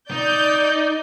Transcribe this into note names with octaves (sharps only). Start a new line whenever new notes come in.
D#4 D5 G6